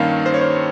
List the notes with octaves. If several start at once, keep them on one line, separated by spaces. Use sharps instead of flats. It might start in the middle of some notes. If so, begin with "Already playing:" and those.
Already playing: G2 D#3 A#3 C#4 F5
C5
C#5
C5